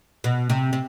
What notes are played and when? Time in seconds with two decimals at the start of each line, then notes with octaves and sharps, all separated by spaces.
0.24 B2
0.50 C3
0.73 C3